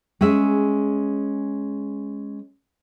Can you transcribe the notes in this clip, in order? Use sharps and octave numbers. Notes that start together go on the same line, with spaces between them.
G#3 C#4 G#4 E5